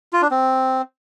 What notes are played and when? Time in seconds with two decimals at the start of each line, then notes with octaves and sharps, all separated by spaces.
0.13 F4
0.22 D4
0.31 C4